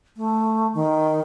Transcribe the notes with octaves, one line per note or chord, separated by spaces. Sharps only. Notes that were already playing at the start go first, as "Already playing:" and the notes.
A3
D#3